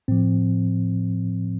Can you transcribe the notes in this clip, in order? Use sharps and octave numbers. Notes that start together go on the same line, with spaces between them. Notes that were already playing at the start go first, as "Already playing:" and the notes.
A2 F3 C4